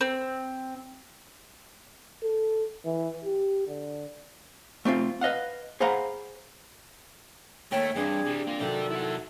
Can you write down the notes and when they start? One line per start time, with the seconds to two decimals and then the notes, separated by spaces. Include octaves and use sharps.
0.01 C4
2.23 A4
2.85 E3
3.25 G4
3.68 D3
4.85 A3 C4 D4 F4
5.21 B4 D#5 F5 F#5
5.80 G#4 C5 F5 F#5 A#5 B5
7.72 D#2 A3 C#5 G5
7.96 G2 E3 C4 D4 G#4
8.26 C3 G3
8.47 A#3 F4
8.60 C3 D#3 F#3 A4 D5 G5
8.90 E4 F#5